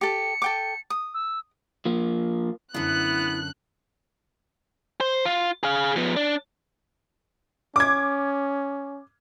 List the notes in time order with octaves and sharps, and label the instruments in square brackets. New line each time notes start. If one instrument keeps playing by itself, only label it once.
[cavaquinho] G4 A4 [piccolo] C#7
[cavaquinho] A4 G5 D6
D#6
[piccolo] E6
[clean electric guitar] F3 A#3
[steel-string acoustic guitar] F#2 D3 [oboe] B3 [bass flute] E4 [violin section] F#6
[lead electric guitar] C5
F4
G#4 F5
F3 B3
D4
[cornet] C#4 [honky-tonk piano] D6 G#6